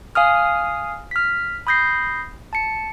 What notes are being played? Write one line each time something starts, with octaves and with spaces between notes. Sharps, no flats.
F5 G#5 D#6 F6
F6 B6
B5 D#6 G6 A#6 C7
A5 C#7